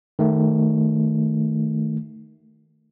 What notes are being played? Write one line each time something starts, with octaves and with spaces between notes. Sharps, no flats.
D#3 A3